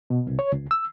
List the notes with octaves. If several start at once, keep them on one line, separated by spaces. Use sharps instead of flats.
B2
C2
C#5
C#2
E6